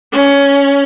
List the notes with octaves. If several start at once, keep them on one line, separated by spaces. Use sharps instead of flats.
C#4